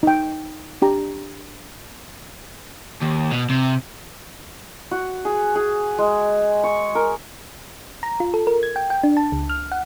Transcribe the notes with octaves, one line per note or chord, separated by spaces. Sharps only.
D#4 G5
D4 G4 A#5
D#2
B2
C3
F#4
G#4
G#4
G#3
C#6
A#4
A#5
F4
A4
A#4
G#6
G5
G5
D4
A5
C#2
F6
F#5